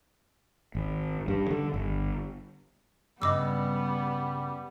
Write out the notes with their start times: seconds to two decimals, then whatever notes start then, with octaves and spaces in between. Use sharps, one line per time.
0.75 G#1
1.28 G2
1.51 D3
1.74 G1
3.22 G2 C#3 G3 B3 D#5 D6 E6